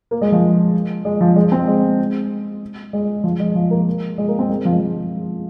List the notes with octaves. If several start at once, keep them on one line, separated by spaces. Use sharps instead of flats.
A#3
G#3
F3
G#3
F3
G#3
C4
G#3
G#3
F3
G#3
F3
A#3
G#3
A#3
C4
G#3
F3
G#3
F3